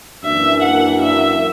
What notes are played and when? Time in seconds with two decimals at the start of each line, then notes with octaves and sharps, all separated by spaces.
0.24 F#2 E3 A#3 D4 E5
0.63 F#5
1.02 E5